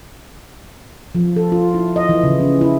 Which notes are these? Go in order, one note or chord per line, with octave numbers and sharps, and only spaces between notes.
F3
A4
F4
E4
D#5
E3
C#3
C#4
E4